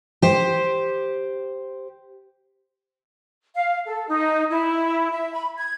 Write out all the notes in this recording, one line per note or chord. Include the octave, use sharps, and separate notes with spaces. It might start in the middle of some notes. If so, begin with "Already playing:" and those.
G4 C5
F5
A4
D#4
E4
E5
B5
G#6